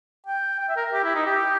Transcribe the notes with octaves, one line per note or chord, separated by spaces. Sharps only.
G5
G5
E5
A#4
G4
E4
D#4
G4